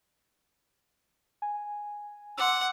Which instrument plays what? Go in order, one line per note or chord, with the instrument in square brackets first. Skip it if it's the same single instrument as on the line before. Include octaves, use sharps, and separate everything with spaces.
[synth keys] G#5
[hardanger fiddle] F#5 [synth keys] C6 D6 E6